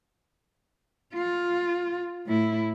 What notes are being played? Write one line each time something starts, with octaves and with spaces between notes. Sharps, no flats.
F4
A2 E4